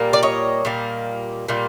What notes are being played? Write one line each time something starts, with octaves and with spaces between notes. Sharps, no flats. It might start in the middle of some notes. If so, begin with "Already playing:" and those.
Already playing: A#2 G3 A#3
D5
C#5 D#5
A#2 G3 A#3
A#2 G3 A#3